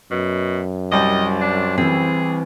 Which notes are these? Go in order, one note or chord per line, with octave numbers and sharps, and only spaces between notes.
F#2 B2
C2 G3 D#5
D4
E3 C4 G#4